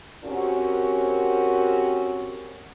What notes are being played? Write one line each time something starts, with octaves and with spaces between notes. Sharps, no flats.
C4 C#4 F#4 G4 A#4